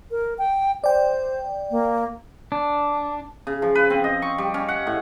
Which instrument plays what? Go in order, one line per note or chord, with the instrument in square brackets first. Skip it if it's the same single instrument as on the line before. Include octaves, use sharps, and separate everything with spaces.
[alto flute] A#4
G5
[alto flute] C5 [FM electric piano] D5 G5
[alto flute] A#3
[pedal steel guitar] D4
[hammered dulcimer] C#3
F3
B4
C4
D#5
C#6
G3
C#4
F#5
A2